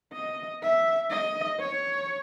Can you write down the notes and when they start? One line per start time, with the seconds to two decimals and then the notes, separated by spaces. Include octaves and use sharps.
0.13 D#5
0.62 E5
1.11 D#5
1.60 C#5